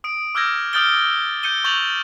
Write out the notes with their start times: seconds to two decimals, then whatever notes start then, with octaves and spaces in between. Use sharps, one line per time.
0.04 D#6 D7
0.35 D6 E6 F6 G6 G#6 A#6
0.73 D#6 F6 G6 A6 D7 G7
1.43 G6 C#7 D#7 G7
1.64 C#6 G6 A6 F7 F#7